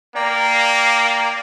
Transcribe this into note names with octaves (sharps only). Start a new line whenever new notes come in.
A#3 D5 G5 A#5